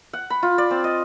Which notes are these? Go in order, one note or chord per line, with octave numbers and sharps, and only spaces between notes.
F#5
B5
F4
D5
C4
D#5